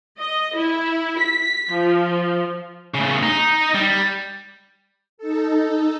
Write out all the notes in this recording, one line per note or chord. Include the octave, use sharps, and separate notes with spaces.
D#5
E4
B6
F3
A2 C#3
D#4
G3
D#4 A4